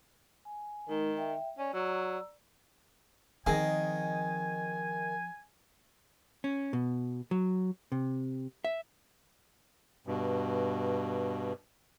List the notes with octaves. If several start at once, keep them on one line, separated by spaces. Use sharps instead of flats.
G#5
D#3 G#3 D#4 A#4
E5 G5
C#4 D5
F#3 D5 A#5 E6
D#3 F3 C4 G#4 D#5 G#5
C#4
B2
F#3
C3
E5
G2 B2